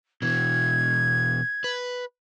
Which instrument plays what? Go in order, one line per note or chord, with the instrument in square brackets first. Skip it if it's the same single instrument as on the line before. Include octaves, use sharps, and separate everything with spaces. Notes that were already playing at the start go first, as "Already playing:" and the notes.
[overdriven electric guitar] B2 E3 [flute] G#6
[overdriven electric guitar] B4